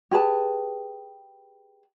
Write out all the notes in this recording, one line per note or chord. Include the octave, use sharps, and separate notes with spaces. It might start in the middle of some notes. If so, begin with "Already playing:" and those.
G4 G#4 B4 A5